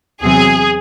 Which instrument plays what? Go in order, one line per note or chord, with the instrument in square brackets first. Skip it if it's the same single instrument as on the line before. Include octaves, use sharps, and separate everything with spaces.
[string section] E2 C3 F#3 C4 G#4